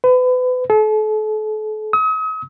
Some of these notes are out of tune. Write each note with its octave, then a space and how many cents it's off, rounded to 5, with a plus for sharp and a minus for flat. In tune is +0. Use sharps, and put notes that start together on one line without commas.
B4 +35
A4 -40
D#6 +40